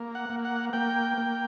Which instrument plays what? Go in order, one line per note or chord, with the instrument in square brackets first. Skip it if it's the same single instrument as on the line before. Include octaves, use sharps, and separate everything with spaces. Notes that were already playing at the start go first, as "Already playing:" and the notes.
Already playing: [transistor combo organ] A#3
F#5
A#3
F#5
A#3 G5
A#3